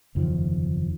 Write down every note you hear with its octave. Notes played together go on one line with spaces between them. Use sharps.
F#1 E2 D#3 F3